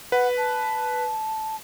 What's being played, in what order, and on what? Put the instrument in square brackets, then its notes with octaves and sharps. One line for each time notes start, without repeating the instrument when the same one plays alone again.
[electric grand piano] B4 [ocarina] F#5
[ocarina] A5